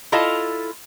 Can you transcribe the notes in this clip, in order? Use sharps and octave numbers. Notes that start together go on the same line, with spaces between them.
E4 F4 A4 D#5 F5